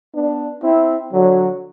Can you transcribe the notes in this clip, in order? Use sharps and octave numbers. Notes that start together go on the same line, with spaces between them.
B3 D4
C4 E4
D3 F#3